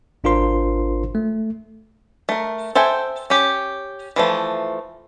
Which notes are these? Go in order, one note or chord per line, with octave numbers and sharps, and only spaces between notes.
G#1 D4 F4 A#4 C5 C6
A3
A3 A#4
A4 C5 E5 G5 G#5
C#4 G4
E3 F3 A3